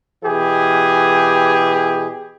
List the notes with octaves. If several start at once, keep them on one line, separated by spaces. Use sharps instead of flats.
B2 E3 G4 G#4